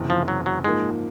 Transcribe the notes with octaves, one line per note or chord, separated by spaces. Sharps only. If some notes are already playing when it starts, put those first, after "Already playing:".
Already playing: F#1 E2 C3 E3
F3
F#3
F#3
G#2 F3 G#3 A#3